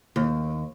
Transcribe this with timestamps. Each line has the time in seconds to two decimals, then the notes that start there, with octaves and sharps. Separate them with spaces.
0.16 D#2